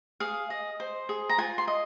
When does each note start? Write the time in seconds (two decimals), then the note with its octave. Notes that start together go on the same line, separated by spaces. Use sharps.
0.20 G#4 F5
0.50 D#5
0.80 C5
1.09 G#4
1.30 A#5
1.38 F4 G#5
1.58 C6
1.68 D#5